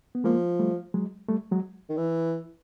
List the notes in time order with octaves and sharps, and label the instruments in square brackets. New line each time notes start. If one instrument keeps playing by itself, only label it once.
[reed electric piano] B3
[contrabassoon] F3 [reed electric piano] G#3 A#3
[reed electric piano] G3 A3
F#3 G#3
G3 A3
F#3 G#3
[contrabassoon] D#3
E3